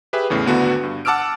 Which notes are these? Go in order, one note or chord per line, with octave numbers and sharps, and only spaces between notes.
G4 G#4 B4 E5
E2 A2 C#3
G#1 D2 D3 B3 D4 F#4
G2
F#5 A5 D6 E6 F6 D7